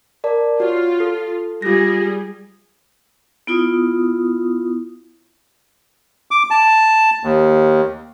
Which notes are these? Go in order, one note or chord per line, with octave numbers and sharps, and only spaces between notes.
A#4 D5 A5
F4 F#4 C#5
A4
G3 F4 G#4 A#6
B3 E4 F4 D#6
D6
A5
D#2